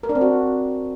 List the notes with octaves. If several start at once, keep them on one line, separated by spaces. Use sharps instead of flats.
A#4
D4
C4
F#4